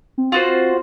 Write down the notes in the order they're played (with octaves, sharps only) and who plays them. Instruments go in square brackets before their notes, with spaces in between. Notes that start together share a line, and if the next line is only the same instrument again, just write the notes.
[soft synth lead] C4
[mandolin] F4 F#4 C5